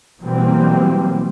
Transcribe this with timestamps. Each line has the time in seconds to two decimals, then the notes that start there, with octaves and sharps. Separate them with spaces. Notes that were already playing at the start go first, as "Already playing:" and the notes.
0.21 B2 E3 F#3 G3 A#3 C4